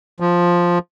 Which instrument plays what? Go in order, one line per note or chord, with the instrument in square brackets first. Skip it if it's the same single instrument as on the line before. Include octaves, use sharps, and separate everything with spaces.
[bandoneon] F3